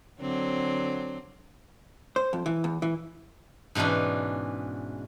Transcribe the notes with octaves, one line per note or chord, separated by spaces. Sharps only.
D3 F#3 C4
C5
F2
E3
E2
E3
G#2 B2 E3 C#4 D4